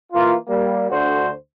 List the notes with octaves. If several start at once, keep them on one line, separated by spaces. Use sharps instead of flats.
E3 A#3 F4
G3 A#3
D2 D3 D4 F#4 C5